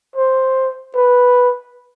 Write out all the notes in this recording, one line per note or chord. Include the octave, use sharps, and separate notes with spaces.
C5
B4